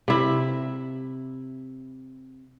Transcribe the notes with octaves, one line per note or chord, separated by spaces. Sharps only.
C3 E4